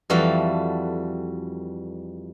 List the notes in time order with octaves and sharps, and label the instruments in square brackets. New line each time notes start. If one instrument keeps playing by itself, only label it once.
[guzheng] F2 E3 G3 F#4 A4 F5